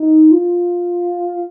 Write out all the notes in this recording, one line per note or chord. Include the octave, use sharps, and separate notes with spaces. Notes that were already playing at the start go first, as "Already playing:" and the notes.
Already playing: D#4
F4